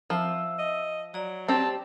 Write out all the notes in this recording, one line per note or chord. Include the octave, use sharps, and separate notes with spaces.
F3 C4 E5 E6
D#5
F#3 D5 A#5
C4 G4 G5 A5